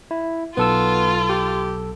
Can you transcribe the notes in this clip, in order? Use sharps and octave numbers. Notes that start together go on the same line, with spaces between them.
E4
B1 B3 F4 A4 E6
G4